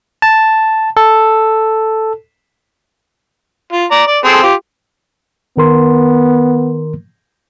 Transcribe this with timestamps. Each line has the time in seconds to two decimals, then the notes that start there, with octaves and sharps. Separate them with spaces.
0.22 A5
0.97 A4
3.72 F4
3.91 D5 A#5
4.07 D5
4.25 C4 G#4 A4
4.43 F4 G4
5.57 D#3 B3 A#4 C6